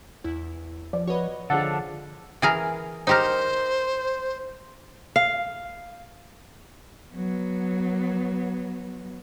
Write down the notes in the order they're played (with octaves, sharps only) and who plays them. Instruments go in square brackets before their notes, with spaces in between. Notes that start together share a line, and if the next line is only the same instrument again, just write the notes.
[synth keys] E2 E4
[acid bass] F3 [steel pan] D5
[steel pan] F#4 B4 [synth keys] C#5 D#5
[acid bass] D3 [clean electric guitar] F3 D4 A4 [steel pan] G#4 F#5
[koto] E3 G#4 A#4
[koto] D#4 G4 A#4 [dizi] C5
[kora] F5
[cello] F#3 B3